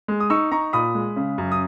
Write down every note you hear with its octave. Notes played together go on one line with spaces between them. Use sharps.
G#3
D#6
D#4 C#6 E6
D#4 A#5 C#6
A#2 B5 D#6
G#3
C#3
F#2
D#6